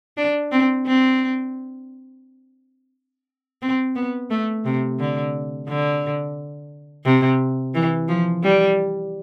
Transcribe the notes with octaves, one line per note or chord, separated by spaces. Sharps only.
D4
C4
C4
C4
B3
A3
C3
D3
D3
C3
E3
F3
G3